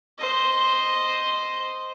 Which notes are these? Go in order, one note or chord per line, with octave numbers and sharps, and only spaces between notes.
C5 D#5